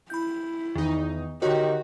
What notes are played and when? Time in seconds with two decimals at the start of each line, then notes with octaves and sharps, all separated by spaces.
0.10 E4 B5 G6
0.75 E2 D#3 D#4
1.42 D3 D#3 F#4 G4 C#5